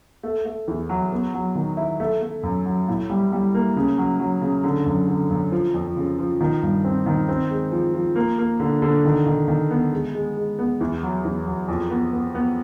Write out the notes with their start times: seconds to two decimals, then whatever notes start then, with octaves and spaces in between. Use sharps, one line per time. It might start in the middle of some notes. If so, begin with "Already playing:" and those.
0.23 A3
0.45 A3
0.68 E2
0.89 F#3
1.12 B3
1.34 F#3
1.55 D#3
1.77 E4
2.00 A3
2.22 A3
2.43 F#2
2.65 F#3
2.88 A2
3.10 G3
3.32 G3
3.54 A#3
3.76 C#3
3.98 F#3
4.20 F#3
4.41 C#3
4.64 D3
4.86 F#2
5.07 D3
5.31 F#2
5.52 F3
5.74 F2
5.96 C#3
6.19 F3
6.41 D#3
6.63 G2
6.84 C4
7.06 D#3
7.29 C4
7.51 G#3
7.72 F3
7.94 F3
8.16 A#3
8.38 A#3
8.60 D3
8.82 D3
9.05 D#3
9.27 D#3
9.48 D#3
9.71 B3
9.93 G#3
10.14 G#3
10.37 G#3
10.59 B3
10.81 E2
11.03 F#3
11.25 E2
11.46 F#3
11.68 F2
11.90 B3
12.12 B3
12.35 B3